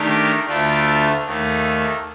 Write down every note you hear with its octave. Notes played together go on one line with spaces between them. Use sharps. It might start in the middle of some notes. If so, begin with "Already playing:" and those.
Already playing: D#3 A3 D4 G4 A#4
D2 D3 A3 D4 F4
D#2 D#3 A3